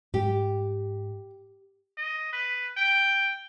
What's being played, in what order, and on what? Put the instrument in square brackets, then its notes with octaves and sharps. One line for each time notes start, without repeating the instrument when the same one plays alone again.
[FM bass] G#2 [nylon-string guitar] G4
[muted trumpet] D#5
B4
G5